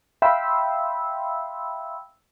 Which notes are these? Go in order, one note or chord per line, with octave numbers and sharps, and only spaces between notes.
E5 F5 G5 B5 C6 E6